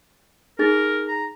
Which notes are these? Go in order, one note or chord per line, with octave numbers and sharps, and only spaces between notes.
D#4 G#4 A#4 A6
A#5